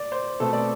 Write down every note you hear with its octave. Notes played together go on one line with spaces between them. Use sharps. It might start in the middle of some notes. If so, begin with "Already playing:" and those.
Already playing: D5
C5
B2 A3 C4 A4
D5